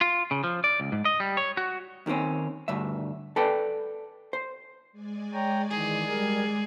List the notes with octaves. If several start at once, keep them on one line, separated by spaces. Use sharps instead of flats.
F4
C#3
F3
D5
C#2
G#2
D#5
G3
C#5
F#4
D#2 D#3 G3 C4 C#4
D2 G2 E5
A4 B4 D5 G5
C5
G#3 D5 G#5
C#5 G5 A#5
D#3 E3 G#4
G3 A#4